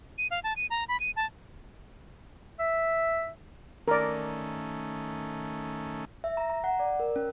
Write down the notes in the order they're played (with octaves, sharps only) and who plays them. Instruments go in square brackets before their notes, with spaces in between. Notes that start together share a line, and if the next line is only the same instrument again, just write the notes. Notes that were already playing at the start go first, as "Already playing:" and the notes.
[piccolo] D#7
F5
A5
D#7
A#5
B5
D#7
A5
[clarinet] E5
[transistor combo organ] D#3 A3 C#4 [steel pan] A#4 D5
[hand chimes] E5
A#5
A#5
F#5
D5
A#4
C#4